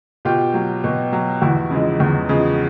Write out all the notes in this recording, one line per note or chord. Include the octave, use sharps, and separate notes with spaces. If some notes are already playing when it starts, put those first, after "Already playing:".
B2 F4 G4
F#3
B2
F#3
E2 E4 F#4
C#3 F3 G#3
E2
C#3 F3 G#3